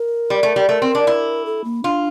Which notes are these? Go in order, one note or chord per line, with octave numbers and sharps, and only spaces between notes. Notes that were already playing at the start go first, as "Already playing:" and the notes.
Already playing: A#4
G3
A3
G3
A3 A#4
C4
D4
E4
A4
A#3
D4 F4